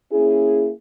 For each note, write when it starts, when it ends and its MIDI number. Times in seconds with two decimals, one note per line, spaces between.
0.12 0.71 58
0.12 0.71 61
0.12 0.71 64
0.12 0.71 68